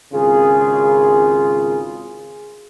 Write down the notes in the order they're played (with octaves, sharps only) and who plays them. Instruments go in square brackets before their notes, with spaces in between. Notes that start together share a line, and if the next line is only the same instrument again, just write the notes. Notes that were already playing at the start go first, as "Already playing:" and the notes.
[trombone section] G#1 C#3 F4 G#4